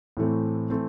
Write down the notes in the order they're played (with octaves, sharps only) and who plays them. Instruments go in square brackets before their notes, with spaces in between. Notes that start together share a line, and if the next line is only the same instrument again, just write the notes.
[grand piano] A2 E3 A3 C4
E3 A3 C4